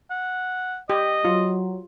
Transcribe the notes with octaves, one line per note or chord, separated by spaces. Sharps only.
F#5
G4 D#5
F#3 F4